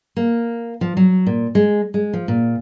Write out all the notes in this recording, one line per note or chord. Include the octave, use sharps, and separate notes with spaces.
A#3
F3
F#3
A#2
G#3
G#3
F3
A#2